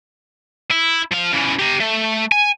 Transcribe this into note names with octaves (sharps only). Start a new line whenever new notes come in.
E4
F3 F5
C#3 E3
G4 A#5
A3
G#5